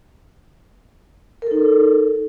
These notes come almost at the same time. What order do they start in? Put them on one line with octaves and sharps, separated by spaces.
A#4 A4 D#4